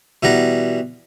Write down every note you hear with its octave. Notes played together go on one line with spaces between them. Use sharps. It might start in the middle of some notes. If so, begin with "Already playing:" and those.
B2 E3 G3 D5 F#5 A#5